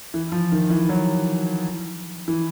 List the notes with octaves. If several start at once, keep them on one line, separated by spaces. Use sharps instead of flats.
E3
F3
D#3
E3
F#3
E3